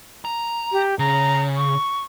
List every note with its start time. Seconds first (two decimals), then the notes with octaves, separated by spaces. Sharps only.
0.25 A#5
0.72 G4
0.99 C#3 A#5
1.57 C#6